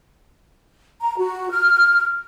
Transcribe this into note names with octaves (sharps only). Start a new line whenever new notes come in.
A#5
F#4
F6